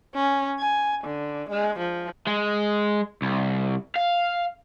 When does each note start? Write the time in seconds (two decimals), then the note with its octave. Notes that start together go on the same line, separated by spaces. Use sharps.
0.15 C#4
0.59 G#5
1.04 D3
1.49 G#3
1.79 F3
2.27 G#3
3.22 C2
3.96 F5